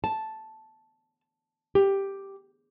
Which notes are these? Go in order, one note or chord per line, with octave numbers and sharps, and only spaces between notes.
A5
G4